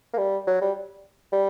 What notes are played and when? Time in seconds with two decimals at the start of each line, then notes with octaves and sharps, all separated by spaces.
0.13 A#3
0.18 G3
0.47 F#3
0.62 G3
1.32 G3